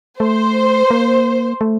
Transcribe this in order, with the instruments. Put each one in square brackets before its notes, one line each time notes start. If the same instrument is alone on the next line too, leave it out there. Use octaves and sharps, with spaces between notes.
[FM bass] A3 [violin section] C5
[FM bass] A#3
A3